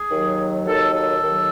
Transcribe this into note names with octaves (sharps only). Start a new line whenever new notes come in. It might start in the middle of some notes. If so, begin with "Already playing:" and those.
Already playing: G#4
D#2 D#3 F#3
D#2 D#3 F#3 A4
A4
D#2 D#3 F#3